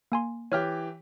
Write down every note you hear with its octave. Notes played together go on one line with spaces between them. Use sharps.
A#3 G#5 C6
E3 G4 C#5 F6